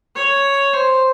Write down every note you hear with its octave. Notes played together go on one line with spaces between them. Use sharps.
C#5
C5